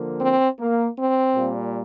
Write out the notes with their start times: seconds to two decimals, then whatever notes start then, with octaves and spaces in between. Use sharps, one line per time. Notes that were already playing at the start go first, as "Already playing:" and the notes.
Already playing: D3 F3 A#3
0.19 C4
0.59 A#3
0.96 C4
1.35 A#2 G3 A#3